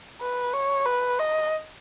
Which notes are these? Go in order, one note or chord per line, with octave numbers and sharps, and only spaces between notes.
B4
C#5
B4
D#5